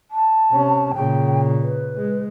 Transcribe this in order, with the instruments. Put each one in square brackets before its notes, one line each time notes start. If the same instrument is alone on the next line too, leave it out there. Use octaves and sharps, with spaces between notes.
[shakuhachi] A5
[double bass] C3 C#4
[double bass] A#2 C#3 [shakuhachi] G5
[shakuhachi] B4
[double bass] G#3